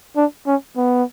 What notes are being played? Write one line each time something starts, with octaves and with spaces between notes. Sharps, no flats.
D4
C#4
B3